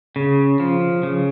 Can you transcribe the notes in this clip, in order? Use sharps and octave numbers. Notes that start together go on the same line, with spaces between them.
C#3
F3
C#3